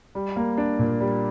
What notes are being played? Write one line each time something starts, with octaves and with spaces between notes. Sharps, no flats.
G3
A#3
D4
A#2
G3